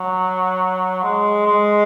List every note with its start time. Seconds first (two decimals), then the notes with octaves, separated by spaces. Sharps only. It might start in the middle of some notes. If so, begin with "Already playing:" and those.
Already playing: F#3
1.03 G#3
1.46 G#3